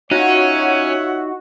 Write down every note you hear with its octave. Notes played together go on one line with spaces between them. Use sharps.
C#4 D#4 F4 F#4 C#5 E5 F#5